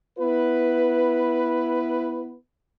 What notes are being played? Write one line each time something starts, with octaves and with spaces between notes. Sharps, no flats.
B3 E4 B4